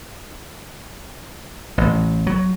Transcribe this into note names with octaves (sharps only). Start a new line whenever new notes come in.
A1
F#3